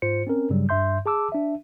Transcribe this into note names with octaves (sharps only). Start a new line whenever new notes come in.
G#2 F4 C5 C#7
C4 C#4 A#4
G2 C#3 F#3 G3
G2 E5 C6 G6
G#4 A5 D6 E6
D4 E5